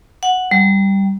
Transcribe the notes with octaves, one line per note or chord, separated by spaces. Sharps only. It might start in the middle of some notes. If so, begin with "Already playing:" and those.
F#5
G3